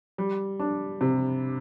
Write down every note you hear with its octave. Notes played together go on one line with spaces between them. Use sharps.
G3
D4
C3